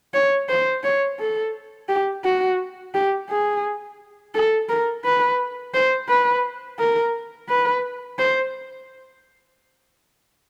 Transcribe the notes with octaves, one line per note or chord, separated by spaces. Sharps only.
C#5
C5
C#5
A4
G4
F#4
G4
G#4
A4
A#4
B4
C5
B4
A#4
B4
C5